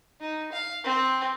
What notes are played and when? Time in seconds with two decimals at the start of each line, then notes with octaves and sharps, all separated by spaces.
0.21 D#4
0.52 F5
0.84 C4